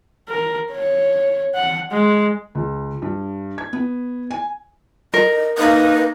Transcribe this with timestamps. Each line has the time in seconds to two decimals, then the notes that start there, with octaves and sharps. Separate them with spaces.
0.29 A#4
0.72 C#5
1.55 F#5
1.92 G#3
2.55 C#2
3.02 G2
3.58 G#6
3.73 B3
4.31 G#5
5.14 A#4 D#5
5.58 A#3 D#4 B4